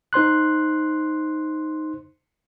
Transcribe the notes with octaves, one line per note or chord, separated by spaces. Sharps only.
D#4 C5 C6 F#6